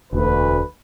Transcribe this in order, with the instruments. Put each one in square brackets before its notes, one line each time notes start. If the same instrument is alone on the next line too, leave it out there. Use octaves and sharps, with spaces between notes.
[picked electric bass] E1 [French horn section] D2 [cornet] B4